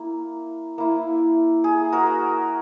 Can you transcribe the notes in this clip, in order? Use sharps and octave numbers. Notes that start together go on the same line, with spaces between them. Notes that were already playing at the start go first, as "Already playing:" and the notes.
Already playing: A#3 E4
A#3 E4
G#4
F#4 A#4